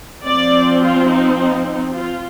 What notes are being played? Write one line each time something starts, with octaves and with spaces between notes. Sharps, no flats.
F3 C4 D5
F4
D#4
D#4
D#4
F4